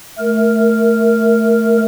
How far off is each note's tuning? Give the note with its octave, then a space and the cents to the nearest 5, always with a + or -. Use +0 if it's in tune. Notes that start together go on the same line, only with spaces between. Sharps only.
A3 +0 A#4 +0